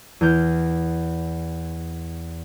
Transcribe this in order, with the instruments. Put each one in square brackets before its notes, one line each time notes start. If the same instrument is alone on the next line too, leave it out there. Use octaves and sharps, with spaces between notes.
[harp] E2 F6 G6